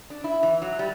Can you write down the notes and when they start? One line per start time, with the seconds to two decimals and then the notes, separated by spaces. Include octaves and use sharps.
0.10 D4
0.24 E4
0.43 E3
0.62 F#3
0.79 G3